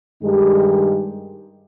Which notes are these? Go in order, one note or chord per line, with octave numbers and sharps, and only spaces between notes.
G2 D#3 G#3 D#4 G4